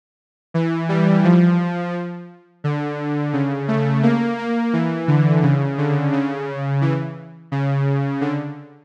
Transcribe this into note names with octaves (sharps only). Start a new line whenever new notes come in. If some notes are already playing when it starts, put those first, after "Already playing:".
E3
G3
F3
D3
C#3
A3
A#3
A#3
E3
D3
C#3
D3
C#3
E3
C#3
D3